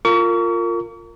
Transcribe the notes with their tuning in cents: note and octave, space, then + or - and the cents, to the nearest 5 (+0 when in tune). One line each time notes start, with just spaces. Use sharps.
F4 +0 A#4 -25 C#6 +40